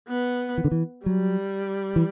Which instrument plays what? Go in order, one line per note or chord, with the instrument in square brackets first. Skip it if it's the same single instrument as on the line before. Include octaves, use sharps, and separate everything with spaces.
[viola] B3
[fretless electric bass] E3
D3
E3
[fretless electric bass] F#3 [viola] G3
[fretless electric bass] E3